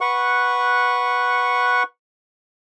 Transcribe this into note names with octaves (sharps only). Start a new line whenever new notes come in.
B4 F#5 C#6